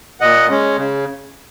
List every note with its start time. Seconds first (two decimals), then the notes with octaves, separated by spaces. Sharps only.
0.21 A#2 D#5 F#5
0.49 G#3 C#4
0.77 C#3